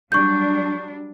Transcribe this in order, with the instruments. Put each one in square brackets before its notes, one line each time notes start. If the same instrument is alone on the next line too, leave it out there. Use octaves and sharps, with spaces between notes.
[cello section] F#3 G3 D4 [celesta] C#6 G6